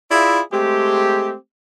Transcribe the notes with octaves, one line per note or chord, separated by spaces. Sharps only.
E4 F4 G#4 D5 E5 B5
G#3 A3 C4 G4